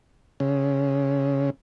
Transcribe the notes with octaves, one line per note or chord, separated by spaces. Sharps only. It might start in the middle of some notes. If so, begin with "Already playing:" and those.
C#3